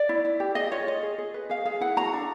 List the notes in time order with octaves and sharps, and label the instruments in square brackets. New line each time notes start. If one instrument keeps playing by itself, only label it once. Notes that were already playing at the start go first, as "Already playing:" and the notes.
Already playing: [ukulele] D5
E4
E4
G4
G#4 D#5
F4 C#5
F4 D#5
G#4
G#4
B4
G#4 F5
G#4 F5
E4 F#5
F#4 A#5
D4